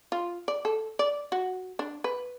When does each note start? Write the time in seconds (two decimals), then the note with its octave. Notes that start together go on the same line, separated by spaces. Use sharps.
0.12 F4
0.48 D5
0.65 A4
0.99 D5
1.32 F#4
1.79 D4
2.04 B4